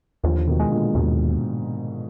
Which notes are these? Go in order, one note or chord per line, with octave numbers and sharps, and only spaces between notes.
D#2 D3 F3
B2 D#3
G#3
A#2 D3
D#2 G#2 B2